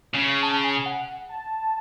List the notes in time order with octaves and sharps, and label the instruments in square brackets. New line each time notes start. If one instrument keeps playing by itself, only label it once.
[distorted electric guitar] C#3
[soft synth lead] A5
G#5
F#5
A5